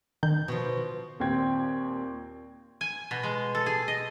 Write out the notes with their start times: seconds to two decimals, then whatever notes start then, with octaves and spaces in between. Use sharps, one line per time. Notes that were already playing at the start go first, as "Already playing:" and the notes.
0.23 D#3 G6
0.48 B2 F3
1.20 D#2 A#2 C4 G5 G#6
2.81 G#5
3.11 B2
3.23 G#3
3.55 A4
3.66 G#4
3.88 D#5